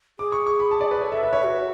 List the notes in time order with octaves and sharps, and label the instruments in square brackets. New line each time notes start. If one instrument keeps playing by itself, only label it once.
[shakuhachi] G#4 [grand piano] D6
[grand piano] C#6
C#6
B5
A5
D5
B4
[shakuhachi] A4 [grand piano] C#5
[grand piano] E5
[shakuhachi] B4 [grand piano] E5
[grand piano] C#5
[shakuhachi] F#4